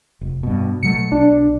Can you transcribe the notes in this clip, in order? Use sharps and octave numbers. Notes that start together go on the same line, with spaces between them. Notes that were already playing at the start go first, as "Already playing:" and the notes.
F1
G2 B2
B2 F#3 A3 C#7
B1 D4